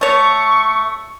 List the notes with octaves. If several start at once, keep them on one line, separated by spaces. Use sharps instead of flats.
A3 C#5 C#6